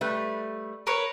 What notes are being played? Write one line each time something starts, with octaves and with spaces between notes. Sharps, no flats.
G3 A3 B4
A#4 B4 C#5